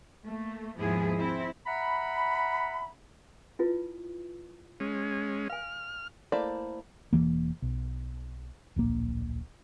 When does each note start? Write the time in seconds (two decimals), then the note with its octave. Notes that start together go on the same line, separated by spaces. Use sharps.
0.24 A3 A#3
0.77 D#2 G#2 F3 B3 E4 G#4
1.17 C4 E4
1.66 E5 F#5 A#5 B5
3.59 E4 F4 B4
4.80 G#3 C#4
5.50 F5 G#5 F6
6.32 A3 A#3 E4 C5 D5
7.13 E1 E2 E3 A#3
7.62 B1
8.76 D1 A#1 A#3